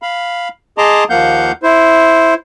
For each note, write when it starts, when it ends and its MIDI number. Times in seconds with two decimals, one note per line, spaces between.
0.02 0.49 77
0.02 0.49 83
0.78 1.04 68
0.78 1.04 75
0.78 1.04 81
0.78 1.04 82
0.78 1.04 84
0.78 1.04 86
1.10 1.52 39
1.10 1.52 53
1.10 1.52 58
1.10 1.52 77
1.10 1.52 78
1.10 1.52 91
1.63 2.34 64
1.63 2.34 72